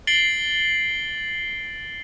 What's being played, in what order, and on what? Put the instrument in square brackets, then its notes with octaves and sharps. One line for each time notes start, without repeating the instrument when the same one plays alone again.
[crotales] A6 C7 D7 F#7 G7